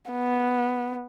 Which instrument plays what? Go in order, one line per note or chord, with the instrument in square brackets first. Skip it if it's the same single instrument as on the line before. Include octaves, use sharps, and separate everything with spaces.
[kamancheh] B3